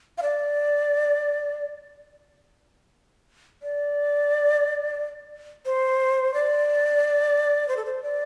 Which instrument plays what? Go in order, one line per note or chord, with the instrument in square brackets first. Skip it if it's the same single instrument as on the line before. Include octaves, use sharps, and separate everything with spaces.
[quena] F5
D5
D5
C5
D5
C5
A4
C5
D5